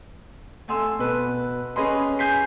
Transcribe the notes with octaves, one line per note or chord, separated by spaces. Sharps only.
A3 G#5 C6 E6
B2 B4
C#4 G#4 B4 D#5 B5 C6
G#5 G6 B6 C7